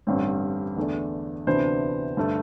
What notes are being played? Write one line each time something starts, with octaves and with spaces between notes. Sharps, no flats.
A1 G2 D3 G3 C4
E2 D3 A3 D4
D2 C3 E3 B3 D4 C5
G2 D3 A3